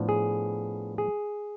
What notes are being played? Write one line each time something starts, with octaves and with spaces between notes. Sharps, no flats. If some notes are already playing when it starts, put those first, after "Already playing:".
Already playing: A2 F3 B3 D4
G#4
G#4